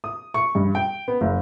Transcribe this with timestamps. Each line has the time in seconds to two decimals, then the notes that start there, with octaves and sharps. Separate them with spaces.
0.04 D#6
0.34 C#6
0.55 G2
0.75 G5
1.08 B3
1.21 F#1